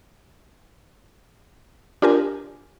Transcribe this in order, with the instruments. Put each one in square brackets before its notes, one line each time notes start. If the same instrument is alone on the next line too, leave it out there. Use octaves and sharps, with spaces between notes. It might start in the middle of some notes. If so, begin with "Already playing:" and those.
[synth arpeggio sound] D4 F4 G4 A#4 G#5